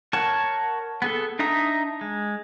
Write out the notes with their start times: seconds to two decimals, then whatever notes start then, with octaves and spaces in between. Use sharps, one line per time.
0.13 A#4 C#5 F#5 A5 C#6
1.02 B3 G#4 A4
1.39 D4 D#4 E5 A#5 D#6
2.01 G#3